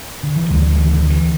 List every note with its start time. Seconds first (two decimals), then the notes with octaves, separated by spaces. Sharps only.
0.23 D3
0.36 E3
0.50 D2 G3
0.66 G3
0.70 E3
0.76 D3
0.90 D3
1.03 D3
1.10 E3